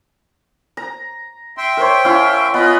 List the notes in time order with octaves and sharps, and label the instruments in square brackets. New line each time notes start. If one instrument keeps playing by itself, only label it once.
[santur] A#5
[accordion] E5 G5 C6
[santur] A#4 C5 C#5
C#4 E4 F5
[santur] B3 [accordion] F4 D#5 B5